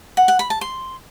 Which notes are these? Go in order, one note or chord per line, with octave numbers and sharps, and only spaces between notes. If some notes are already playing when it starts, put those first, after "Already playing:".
F#5
F#5
B5
A5
C6